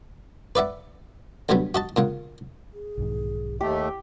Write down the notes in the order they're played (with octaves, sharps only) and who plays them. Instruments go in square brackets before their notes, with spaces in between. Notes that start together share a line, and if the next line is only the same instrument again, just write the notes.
[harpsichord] B4 D5 E5 F#5
D2 G2 F#3 G3 B3
F#4 D#5 A5
A#2 C#3 F#5
[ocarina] G#4
[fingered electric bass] B1 G#2 D#3
[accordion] D#2 A3 [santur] G4 [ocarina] D#5